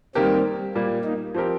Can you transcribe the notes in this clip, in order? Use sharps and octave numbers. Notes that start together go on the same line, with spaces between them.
D#3 G3 A#3 C4 G4 A#4
A#2 G3 A#3
A#3 D#4
F3 C4 G4 A#4